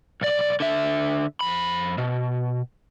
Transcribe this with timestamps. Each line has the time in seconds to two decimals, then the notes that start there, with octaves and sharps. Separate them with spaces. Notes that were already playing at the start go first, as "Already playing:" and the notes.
0.21 B1 D5
0.60 D3 E5
1.41 F2 B5
1.98 B2